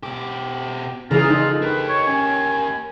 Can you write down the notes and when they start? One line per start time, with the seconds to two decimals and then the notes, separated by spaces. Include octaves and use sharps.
0.03 B2 G4 D6
1.11 C#3 E3 F3 F4 G#4 A#5
1.28 D4 D#4 A4 D#5
1.62 A#3 G4 B4
1.88 C#5
2.07 C#4 G#5